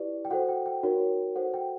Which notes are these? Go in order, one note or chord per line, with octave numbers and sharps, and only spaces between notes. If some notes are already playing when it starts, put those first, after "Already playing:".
Already playing: E4 G4 B4 D5
G5
F#4 A4 C5 F#5
G5
G5
D#4 F#4 A#4 C#5
F#4 A4 C5 F#5
G5